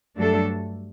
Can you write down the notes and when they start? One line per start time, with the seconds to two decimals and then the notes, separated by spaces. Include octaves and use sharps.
0.17 G2 F#3 A3 D4 A4